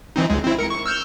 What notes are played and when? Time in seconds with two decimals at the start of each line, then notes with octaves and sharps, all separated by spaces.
0.16 E3 C4 D#4
0.30 C#2 G#3
0.44 C4 E4
0.59 A#4 C#7
0.70 C#6
0.86 E6 F6 G6